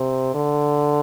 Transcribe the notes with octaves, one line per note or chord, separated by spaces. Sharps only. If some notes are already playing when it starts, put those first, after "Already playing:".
Already playing: C3
D3